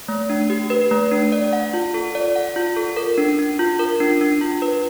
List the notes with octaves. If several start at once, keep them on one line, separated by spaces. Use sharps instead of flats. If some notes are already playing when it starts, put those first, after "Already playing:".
A3
D4
G4
B4
A3
D4
D5
F#5
F4
A4
D5
F#5
F4
A4
A#4
D4
D4
F4
A#4
D4
D4
F4
B4